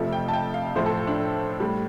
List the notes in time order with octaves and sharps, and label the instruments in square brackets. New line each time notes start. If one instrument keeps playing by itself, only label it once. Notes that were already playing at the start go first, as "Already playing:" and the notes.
Already playing: [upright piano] F2 C3 F3 A3
G5
A5
G5
F5
A2 F3 A3 C5
A4
D4
A2 G3